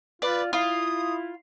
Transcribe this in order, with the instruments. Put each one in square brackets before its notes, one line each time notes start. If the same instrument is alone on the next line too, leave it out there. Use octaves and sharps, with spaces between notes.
[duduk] F4 [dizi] B4 [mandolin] D5
[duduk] E4 [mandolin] F4 [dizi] D#6